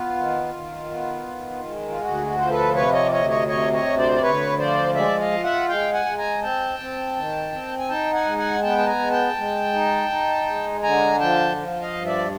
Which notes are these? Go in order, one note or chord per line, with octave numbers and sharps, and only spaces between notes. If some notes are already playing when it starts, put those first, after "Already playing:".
Already playing: B3 F4
D#3
D#3
B3
D#3
G#3
F4
D2 F#4
F#4
F3 C5
A4 B4
C3 B4 C#5
C#5 D#5
D5
D2 C#5 D#5
C#5 D#5
C3 C#5 D#5
C#5 D#5
D2
C5 D5
D5
D2 B4 C#5
F3 C5 D5
G#3 D5 E5
D#5 F5
F4
E5 F#5
G#3 F5 G5
F#5 G#5
G#3
G#5 A#5
C4 G5 A5
C4
D#3
C4
G#5
D#4 G5 A5
F#5 G#5
G#3
F#5 G#5
B3 G5 A5
A5
G#5 A#5
G#3
G5 A5
G#3
D#4
D#4
G#3
D3 G#5 A#5
F3 G5 A5
F3
D#5 F5
G2
D5 E5